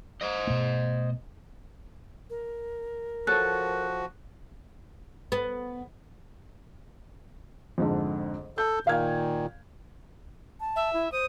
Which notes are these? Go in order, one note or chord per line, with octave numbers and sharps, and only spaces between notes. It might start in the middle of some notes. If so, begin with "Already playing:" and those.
C5 D#5
B2 A3
A#4
F3 F#4 A4 C#5 F#6
B3
F2 G#2 D3
A4 G6
A#2 D#3 F5 F6 G#6
A5
E5
E4
C5 D#6